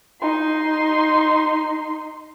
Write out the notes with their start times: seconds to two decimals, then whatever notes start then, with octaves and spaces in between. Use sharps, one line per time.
0.21 D#4 C6